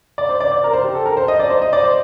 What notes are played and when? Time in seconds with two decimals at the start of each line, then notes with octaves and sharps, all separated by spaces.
0.18 D5
0.29 C5
0.40 D5
0.52 D5
0.64 A#4
0.73 C5
0.84 G4
0.95 A4
1.06 A#4
1.17 C5
1.28 D#5
1.39 D5
1.50 C5
1.62 D#5
1.73 D5
1.83 C5